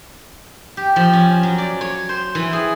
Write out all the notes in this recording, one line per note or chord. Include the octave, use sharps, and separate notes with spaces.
G4
F3
C#4
F#3
D5
C#5
C5
E3
G#4